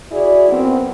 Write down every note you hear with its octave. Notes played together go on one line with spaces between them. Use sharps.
E4 F#4 G#4 D5
F#2 B3 C4